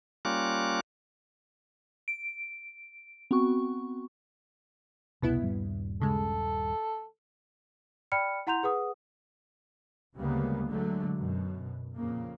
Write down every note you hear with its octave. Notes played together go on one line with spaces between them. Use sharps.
G3 A#3 C#4 F4 D6 F#6
D7
B3 C4 F#4 C#6
E1 C2 B2 B3 E4
D#1 G2 G3
C#3 G#3 A4
D5 G5 B5 F6 C#7
E4 F#5 A#5 C6 G6 F7
G#4 B4 F#5 D#6
D2 C#3 G3 G#3 A#3 B3
D3 F#3 G#3 A3
F#2 B2
F2 A#2 C#3 A#3